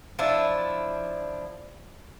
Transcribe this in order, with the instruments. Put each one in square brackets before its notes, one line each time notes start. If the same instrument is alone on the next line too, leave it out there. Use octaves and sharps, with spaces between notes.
[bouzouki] F3 D4 E4